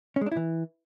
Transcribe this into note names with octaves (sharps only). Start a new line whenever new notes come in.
C#4
G#3
D4
E4
E3